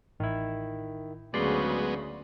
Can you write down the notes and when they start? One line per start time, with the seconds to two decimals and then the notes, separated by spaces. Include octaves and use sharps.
0.20 A1 D#3 E4
1.34 D2 C#3 F#3 G#3 B3 D5 C6